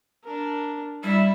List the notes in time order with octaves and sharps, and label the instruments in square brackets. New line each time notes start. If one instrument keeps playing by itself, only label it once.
[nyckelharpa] D4 A#4
[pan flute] G3 [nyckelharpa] E4 E5